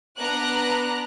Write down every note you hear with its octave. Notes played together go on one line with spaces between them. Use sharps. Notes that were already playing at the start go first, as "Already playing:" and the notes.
B3 D4 A#5 F#6